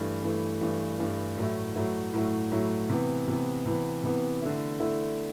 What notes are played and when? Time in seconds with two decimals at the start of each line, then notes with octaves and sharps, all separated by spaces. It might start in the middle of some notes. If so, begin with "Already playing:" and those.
Already playing: G2 E3 A3
0.23 G2 E3 A3
0.61 G2 E3 A3
0.99 G2 E3 A3
1.37 A2 F#3 A3 E4
1.75 A2 F#3 A3 E4
2.13 A2 F#3 A3 E4
2.52 A2 F#3 A3 E4
2.89 C3 E3 B3
3.28 C3 E3 B3
3.66 C3 E3 B3
4.03 C3 E3 B3
4.42 D3 A3 E4
4.80 D3 A3 E4